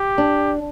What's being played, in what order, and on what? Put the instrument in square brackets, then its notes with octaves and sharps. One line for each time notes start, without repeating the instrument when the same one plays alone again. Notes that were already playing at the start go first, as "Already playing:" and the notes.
Already playing: [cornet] G4
[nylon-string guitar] D4